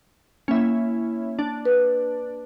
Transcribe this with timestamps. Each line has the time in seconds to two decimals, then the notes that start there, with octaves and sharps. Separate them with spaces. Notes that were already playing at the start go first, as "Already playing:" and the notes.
0.48 A#3 C#4 E4
1.39 D4
1.65 B4